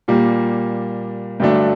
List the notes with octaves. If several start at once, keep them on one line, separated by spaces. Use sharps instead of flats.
A#2 G3 A#3
G2 D3 F#3 A3 D4